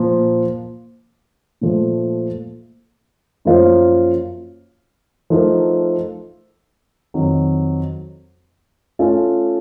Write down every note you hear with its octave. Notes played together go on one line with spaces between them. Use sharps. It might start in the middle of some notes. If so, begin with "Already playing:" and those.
Already playing: A#2 F3 A#3
A#2 F3 A3
F#2 F3 A#3 F4 C5
F3 A3 D#4 A#4
F2 D#3 F#3
A3 C#4 F4 A4